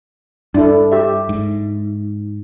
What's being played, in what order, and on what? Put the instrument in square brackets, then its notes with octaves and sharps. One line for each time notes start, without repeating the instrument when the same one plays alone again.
[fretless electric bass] G2 [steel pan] D4 E4 A4
[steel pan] G4 E5
[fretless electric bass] G#2